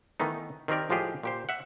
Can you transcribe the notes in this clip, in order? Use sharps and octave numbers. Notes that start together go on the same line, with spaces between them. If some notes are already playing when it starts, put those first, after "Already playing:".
D#3 E3 A3 B3 D#4
D#3 C4 G4 A#4 D5
A2 F3 G#3 F4 G4 G#4
A#2 G4 C5
E5 F#5